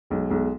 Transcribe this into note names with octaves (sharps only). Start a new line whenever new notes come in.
B1 G#3
B1 G#3